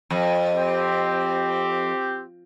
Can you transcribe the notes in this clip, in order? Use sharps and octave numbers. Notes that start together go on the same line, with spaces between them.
F2
C4 G4